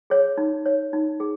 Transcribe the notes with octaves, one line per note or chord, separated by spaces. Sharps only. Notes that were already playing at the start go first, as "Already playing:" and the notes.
G#4 C#5
D#4
C#5
D#4
G#4